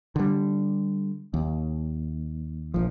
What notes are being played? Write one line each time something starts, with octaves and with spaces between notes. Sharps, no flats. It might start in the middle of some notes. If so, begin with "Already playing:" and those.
D3 G3
D#2
A#1 F3